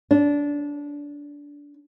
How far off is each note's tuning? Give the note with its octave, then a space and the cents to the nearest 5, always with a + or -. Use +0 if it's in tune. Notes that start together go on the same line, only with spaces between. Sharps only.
D4 -20